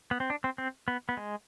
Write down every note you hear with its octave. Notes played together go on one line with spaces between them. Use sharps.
B3
C4
D4
C4
C4
B3
B3
G#3